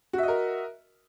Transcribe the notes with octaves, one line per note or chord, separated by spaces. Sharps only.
F#4 A#4 D#5 E5